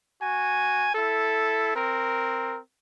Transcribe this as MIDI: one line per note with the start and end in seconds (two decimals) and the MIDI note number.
0.21 0.91 66
0.21 0.91 80
0.95 1.71 64
0.95 1.71 69
1.75 2.59 60
1.75 2.59 70